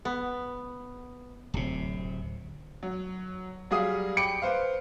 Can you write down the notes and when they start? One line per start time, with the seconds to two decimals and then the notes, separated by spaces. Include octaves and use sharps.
0.05 B3
1.54 D1 C3
2.83 F#3
3.71 F#3 G3 F#4 G#4 F5 D#6
4.17 G5 B5 D6 C#7 D7
4.42 B4 C5 F5